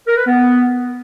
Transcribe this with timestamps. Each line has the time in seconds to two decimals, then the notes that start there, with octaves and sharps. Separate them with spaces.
0.07 A#4
0.17 B4
0.27 B3